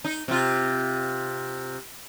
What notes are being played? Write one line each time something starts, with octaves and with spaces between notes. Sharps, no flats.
D#4
C3 F4